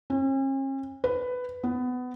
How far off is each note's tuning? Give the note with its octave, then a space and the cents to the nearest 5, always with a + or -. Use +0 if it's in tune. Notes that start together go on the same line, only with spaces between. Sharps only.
C#4 -45
B4 +10
B3 +20